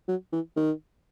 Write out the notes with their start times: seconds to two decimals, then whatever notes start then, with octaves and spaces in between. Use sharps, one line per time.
0.08 F#3
0.33 E3
0.56 D#3